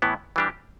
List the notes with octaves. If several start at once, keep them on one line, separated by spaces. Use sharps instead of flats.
A2 E3 B3 E4
E3 G3 D4 G4